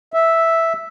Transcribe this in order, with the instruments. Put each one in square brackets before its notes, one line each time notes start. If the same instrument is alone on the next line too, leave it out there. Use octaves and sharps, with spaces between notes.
[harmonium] E5